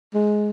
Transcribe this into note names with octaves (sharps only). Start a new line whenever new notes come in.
G#3